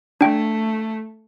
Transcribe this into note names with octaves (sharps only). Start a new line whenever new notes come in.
A3 D4 G5